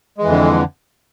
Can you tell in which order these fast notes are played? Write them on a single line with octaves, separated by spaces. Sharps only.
G#3 E3 F2 D3